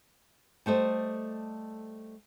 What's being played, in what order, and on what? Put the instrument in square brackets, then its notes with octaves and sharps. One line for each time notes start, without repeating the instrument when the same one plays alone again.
[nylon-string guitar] G3 A3 C5 D#5